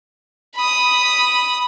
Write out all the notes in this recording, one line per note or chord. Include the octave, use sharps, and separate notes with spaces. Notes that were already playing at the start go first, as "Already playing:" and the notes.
B5 D#6